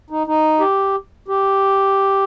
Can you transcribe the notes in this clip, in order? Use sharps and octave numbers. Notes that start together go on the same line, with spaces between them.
D#4
D#4
G4
G4